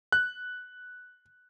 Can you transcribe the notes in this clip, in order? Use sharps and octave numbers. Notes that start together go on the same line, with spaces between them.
F#6